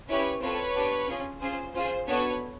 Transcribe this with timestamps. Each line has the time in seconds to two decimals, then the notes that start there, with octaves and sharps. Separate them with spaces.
0.08 C#4 E4 G4 B4 C#5
0.41 C4 F4 A4 B4 C#5
0.75 B3 D4 G4
1.08 C#4 F4 G#4
1.41 C#4 F4 G#4 C5
1.74 C#4 F4 G#4 C5
2.07 B3 D4 F#4 A4 B4 C#5